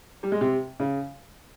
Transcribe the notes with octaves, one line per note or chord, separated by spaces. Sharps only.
G3
G#3
C3
C#3